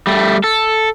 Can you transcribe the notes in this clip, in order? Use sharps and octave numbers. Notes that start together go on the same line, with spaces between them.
G3 A3
A4